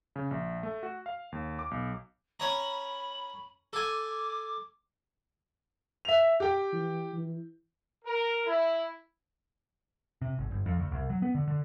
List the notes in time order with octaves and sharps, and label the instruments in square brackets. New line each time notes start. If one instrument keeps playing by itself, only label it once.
[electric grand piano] C#3
A#1
A3
F#4
F5
D#2
D6
B1
[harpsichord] C#4 C#5 A#5 [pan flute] B5
[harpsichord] A4 G#5 [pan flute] D6
[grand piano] E5 F7
G4 G5
[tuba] E3
E3
[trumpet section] A#4
E4
[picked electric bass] C3
G#1
G1
F2
D2
C2
F#3
B3
D3
D3